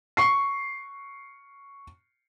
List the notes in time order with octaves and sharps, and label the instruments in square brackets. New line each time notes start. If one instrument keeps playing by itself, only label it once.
[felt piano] C#6 C7